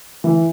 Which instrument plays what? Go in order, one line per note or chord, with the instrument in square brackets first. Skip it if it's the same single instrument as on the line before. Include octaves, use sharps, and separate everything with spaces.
[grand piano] E3